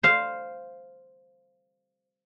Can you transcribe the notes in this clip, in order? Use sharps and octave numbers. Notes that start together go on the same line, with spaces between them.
C5 F5